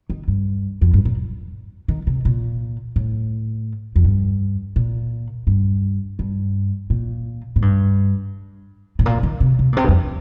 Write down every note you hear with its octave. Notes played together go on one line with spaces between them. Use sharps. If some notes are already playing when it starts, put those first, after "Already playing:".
D#3
G2
F2
G2
A#2
D#3
C3
A#2
A2
F2
G2
A#2
G2
G2
A#2
A2
G2
A2
A#2
D#3
C3
C3
A#2
C3
G2
F2